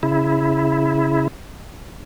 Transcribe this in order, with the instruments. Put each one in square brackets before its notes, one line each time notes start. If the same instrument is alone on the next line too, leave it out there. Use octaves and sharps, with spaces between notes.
[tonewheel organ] C#3 E4